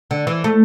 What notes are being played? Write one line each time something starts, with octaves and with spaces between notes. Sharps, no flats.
D3
E3
A3